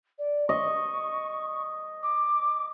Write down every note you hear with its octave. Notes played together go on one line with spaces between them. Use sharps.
D5
D#5 C#6
D6